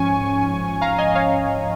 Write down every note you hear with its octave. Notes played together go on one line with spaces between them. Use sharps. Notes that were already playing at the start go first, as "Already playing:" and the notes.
Already playing: G#2 F3 C#4 G#5 C#6
F5 A#5
D#5 G#5
C#5 F5